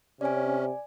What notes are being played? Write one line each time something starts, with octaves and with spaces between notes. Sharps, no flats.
C3 C#4 D5 G#5